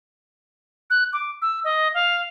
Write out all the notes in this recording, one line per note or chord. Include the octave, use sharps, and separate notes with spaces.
F#6
D6
E6
D#5
F5